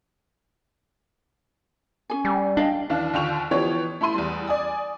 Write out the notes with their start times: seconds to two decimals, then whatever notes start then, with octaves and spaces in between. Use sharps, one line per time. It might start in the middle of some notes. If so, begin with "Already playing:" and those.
2.10 C#4 G#4 G#5
2.25 G3
2.57 D4 D#5 F5 G5
2.90 D#2 E3 D4 F5
3.13 D#2 D3 F4 G5 C#6 F7
3.51 E3 F3 B3 G4 C#5
4.01 A3 E4 B5 C6 D#7
4.14 E2 G3
4.47 D5 G#5 D#6